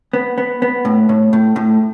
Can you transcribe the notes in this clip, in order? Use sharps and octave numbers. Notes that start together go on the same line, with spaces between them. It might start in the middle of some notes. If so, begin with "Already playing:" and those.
B3
B3
B3
A2
A2
A2
A2